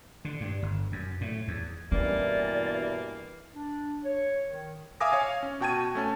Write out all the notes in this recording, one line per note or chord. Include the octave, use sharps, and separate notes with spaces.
D3
G2
G1
F#2
A2
E2
G2 B2 E3 A#3 C#4 D5
D4
C#5
D#3
E5 F5 G#5 D6 D#6 A#6
C#5 F5 G#5
C#4
B2 F#4 G5 A5 G#6 D#7
A3 C#4 A5